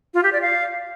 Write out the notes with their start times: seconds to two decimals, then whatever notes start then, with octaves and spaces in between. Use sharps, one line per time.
0.14 F4
0.23 G4
0.33 D5
0.42 F5